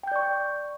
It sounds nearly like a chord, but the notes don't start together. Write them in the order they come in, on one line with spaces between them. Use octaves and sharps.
G5 G6 D5 C#6